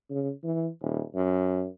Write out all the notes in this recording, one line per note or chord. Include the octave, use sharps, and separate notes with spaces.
C#3
E3
D#1
F#2